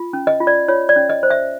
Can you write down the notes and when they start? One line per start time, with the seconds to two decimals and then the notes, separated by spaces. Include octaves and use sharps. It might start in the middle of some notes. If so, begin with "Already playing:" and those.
Already playing: F4
0.13 C#4
0.27 D#5
0.40 F4
0.47 D5
0.68 F4 C#5
0.89 D5
0.96 C#4
1.10 D#5
1.23 C5
1.30 E5